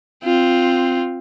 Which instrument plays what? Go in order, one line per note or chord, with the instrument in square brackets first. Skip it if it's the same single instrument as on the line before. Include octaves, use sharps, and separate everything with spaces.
[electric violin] C4 F4